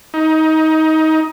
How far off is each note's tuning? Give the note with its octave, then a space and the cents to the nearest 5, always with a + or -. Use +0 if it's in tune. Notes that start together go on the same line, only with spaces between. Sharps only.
D#4 +20